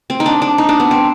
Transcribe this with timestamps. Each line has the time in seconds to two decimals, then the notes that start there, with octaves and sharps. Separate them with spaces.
0.10 C4
0.20 D#4
0.26 D4
0.42 D4
0.58 D#4
0.69 D4
0.80 B3
0.91 C4